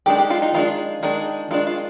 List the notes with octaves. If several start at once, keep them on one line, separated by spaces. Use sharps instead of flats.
D#3 G#3 D4 G4
G4
F4
D#4
D#3 G#3 D4 F4
D#3 G#3 D4
D#3 G#3 D4 F4
F4